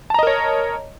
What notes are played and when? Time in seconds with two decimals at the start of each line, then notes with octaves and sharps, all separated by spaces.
0.10 A5
0.14 A#5
0.19 D#5
0.23 A#4
0.27 C#5